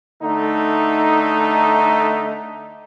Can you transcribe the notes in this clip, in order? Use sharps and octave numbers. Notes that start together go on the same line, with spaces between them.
D3 A3 D#4